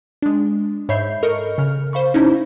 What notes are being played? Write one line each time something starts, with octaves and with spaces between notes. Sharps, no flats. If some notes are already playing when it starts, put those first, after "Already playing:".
G#3 D4
G#2 C#5 E5 B5 G6 C7
A4 A#4 D#5 C#6 F6 C#7
C#3 F6
C5 F5 B5 C#6
C#4 D#4 E4